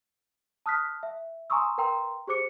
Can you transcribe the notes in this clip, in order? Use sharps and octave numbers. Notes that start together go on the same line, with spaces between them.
A5 D#6 F6 F#6 B6
E5
G#5 A#5 C6 C#6 D#6 E6
A#4 B4 G5 A#5 C6
G4 G#4 C5 D6 C#7